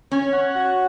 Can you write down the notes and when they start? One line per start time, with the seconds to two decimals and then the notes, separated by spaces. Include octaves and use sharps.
0.12 C#4 C#5
0.33 F#5
0.55 F#4